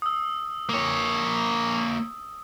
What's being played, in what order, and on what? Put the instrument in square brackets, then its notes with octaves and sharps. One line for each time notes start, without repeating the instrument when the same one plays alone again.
[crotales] D#6 E6
[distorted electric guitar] A#3 C#5